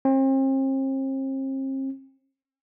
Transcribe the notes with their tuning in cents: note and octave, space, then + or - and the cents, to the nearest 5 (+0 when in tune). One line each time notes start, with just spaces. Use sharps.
C4 +40